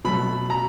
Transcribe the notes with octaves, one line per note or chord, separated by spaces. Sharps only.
B2 F#3 A3 B5
A#5